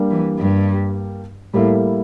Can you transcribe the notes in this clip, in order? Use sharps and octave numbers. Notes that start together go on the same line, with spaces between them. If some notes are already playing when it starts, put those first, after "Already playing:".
Already playing: G3 A#3 D4 G4
E3
G2
A2 G3 A#3 E4 A4